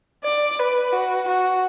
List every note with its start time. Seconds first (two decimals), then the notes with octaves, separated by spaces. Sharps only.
0.24 D5
0.59 B4
0.93 F#4
1.28 F#4